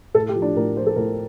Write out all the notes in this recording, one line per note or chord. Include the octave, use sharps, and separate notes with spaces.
A2 A4
G4
F3
D4
A2 A#4
F3 C5
A4
A2 A#4